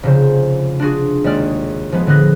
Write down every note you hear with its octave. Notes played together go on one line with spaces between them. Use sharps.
F1 C#3 C5
D4 F4 F#4 G#4
D#2 G#3 D5 F6
F3 G#3 B3
A2 D3 B3 G#4 F#6 A#6